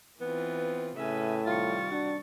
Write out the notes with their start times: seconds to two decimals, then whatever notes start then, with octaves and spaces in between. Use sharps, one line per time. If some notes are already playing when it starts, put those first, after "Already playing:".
0.21 E3 B3 C4 F4
0.96 A2 C#3 C#4 B4 E5 G#5
1.46 C3 D#3 G3 F4 C#6 A6
1.91 D4 F#4